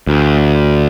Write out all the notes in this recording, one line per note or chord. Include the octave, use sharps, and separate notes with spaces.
D2